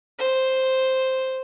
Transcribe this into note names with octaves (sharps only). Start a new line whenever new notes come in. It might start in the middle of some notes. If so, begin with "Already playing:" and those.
C5